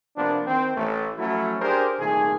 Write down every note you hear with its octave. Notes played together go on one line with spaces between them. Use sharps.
C3 F3 A#3 B3 D4
D#3 C4
A1 A3
F3 F#3 A3 C#4 E4 F#4
D4 G4 G#4 A#4 C5
C2 A#2 D#3 A3 G#4